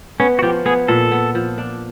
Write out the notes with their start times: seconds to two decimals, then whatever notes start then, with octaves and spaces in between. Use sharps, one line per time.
0.20 B3 C#4
0.39 F#4
0.42 F3 G4
0.65 B3 G#4
0.88 A#2 A4
1.11 B3
1.35 F3
1.58 D4